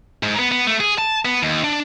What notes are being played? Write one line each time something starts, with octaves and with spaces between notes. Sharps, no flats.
G#2
B3
B3
A3
G#4
A5
B3
D#2
D4